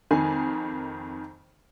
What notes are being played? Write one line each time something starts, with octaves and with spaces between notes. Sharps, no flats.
F2 D#3 G#5